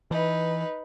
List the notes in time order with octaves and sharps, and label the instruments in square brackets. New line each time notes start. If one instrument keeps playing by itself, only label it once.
[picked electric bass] E3 [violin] D#4 B4